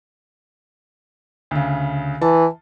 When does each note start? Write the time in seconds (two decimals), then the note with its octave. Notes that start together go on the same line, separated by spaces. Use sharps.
1.51 D2 C#3
2.21 E3 A5